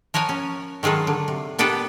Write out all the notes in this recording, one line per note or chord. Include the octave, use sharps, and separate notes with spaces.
F3 A#4 C#5 F#5 G#5
C#4
D#3 F#3 G#3 F4 A4
D3
C3
A#2 B3 D4 G4 A4 B4